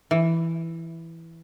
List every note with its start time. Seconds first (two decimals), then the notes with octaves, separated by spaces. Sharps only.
0.11 E3